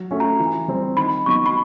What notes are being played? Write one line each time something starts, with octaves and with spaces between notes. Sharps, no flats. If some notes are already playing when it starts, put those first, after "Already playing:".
Already playing: F#3
A3 C#4 F#4
A#5
E3
G3 C4
D#3 B5
F#3 B3 D#4 C#6
B5